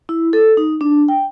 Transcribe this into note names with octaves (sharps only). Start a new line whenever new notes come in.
E4
A4
D#4
D4
G5